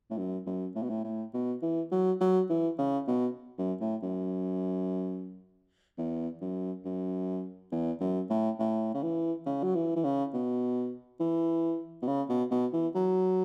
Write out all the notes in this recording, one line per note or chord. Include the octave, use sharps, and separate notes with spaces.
A2
F#2
F#2
A2
B2
A2
A2
B2
E3
F#3
F#3
E3
C#3
B2
F#2
A2
F#2
E2
F#2
F#2
E2
F#2
A2
A2
C#3
E3
C#3
F#3
E3
E3
C#3
B2
E3
B2
C#3
B2
B2
E3
F#3